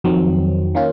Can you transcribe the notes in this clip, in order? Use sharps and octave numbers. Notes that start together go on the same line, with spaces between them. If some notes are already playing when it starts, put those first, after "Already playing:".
F2 D#3 F#3 C4
D#3 A#3 C#4 F4